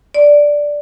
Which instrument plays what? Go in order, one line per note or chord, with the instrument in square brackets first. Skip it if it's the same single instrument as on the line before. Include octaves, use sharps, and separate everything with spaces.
[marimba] D5